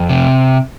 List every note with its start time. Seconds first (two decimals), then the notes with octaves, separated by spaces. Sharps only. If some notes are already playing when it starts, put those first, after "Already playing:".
Already playing: F2
0.09 C3